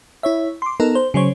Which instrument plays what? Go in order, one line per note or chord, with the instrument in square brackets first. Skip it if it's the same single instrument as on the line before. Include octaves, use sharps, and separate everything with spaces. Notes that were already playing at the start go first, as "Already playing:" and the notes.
[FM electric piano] E4 C#5 E5
C6 D6
B3 D#4 A4 A#4
C5
C#3 F#3 C5 C#5